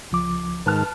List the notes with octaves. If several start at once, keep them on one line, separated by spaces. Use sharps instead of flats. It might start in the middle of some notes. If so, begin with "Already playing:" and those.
C#2 F3 D6
G#2 D#3 B4 A5 F6